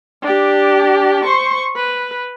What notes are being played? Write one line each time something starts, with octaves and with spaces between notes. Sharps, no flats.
D4 G4
C5 C#6
B4